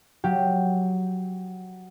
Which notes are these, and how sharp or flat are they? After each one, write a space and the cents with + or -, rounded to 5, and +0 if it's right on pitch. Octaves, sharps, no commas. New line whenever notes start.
F#3 +0 G4 +0 F5 +30